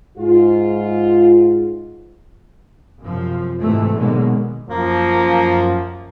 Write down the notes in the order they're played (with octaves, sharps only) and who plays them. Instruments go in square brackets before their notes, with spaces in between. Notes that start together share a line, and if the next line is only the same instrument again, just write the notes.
[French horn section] G#2 F4
[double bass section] F#2 C3 F3
G#2 C3 E3 A3
B2 D3 D#3 F#3 G#3 A#3
[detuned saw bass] F#2 [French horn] F3 [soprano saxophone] A#3